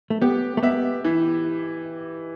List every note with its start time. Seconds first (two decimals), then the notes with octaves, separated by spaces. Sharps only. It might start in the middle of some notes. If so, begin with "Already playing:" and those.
0.10 A3
0.22 B3 G4
0.57 A3
0.63 B3 E5
1.04 E3